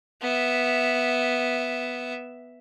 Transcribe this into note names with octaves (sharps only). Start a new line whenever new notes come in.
B3 E5